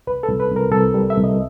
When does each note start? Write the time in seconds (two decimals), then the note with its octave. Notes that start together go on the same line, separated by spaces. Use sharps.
0.07 C2 B4
0.23 A4
0.29 C2
0.40 B4
0.51 C2
0.56 A#4
0.72 C2 A4
0.94 G3
1.10 E5
1.17 C2
1.24 D#5